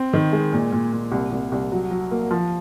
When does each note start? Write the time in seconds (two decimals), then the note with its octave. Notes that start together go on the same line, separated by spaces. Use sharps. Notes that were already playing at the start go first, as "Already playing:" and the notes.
Already playing: C4
0.13 D#3
0.33 G#3
0.53 A#2
0.72 A#2
0.92 A#2
1.12 C2
1.32 C2
1.52 C2
1.72 F#3
1.91 F#3
2.11 A#3
2.31 F3